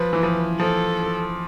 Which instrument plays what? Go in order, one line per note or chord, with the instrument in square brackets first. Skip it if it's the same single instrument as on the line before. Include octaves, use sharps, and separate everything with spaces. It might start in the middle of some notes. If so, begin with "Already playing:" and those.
Already playing: [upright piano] F3 [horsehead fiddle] B4
[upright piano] E3
F3
[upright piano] F3 [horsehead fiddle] A4